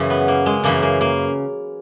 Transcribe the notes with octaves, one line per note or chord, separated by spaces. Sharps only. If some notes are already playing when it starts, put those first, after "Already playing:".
Already playing: F#2 C#3 E3
B3
A#3
G#3
F#2 C#3 E3 A#3
A#3
A#3